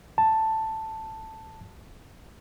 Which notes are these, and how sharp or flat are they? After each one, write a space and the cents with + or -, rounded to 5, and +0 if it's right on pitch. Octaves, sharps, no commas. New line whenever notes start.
A5 +5